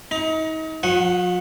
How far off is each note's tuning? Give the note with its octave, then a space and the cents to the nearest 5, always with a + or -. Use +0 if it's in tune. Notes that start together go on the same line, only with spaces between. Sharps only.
D#4 +35 A#5 +25
F3 +45 F#5 +0 C#6 -30